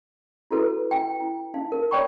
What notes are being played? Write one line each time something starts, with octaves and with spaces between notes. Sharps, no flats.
E4 F#4 A4 B4
G5
E4
D#4 F5
A#4
C#5 D5 G5 B5 C#6